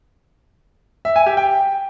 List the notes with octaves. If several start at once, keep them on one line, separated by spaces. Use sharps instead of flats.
E5
G#5
G4
G5